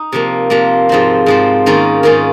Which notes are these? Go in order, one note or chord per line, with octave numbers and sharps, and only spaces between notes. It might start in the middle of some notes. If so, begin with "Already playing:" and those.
Already playing: D#4
C3 F3 A#3
C3 F3 A#3
G#2 F3 C4
G#2 F3 C4
G#2 D#3 A#3 C#4 F4
G#2 D#3 A#3 C#4 F4